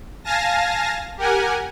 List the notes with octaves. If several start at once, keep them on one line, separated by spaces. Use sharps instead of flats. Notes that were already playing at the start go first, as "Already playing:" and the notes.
F5 G#5 A5 A#6
G4 A#4 F#5 G#5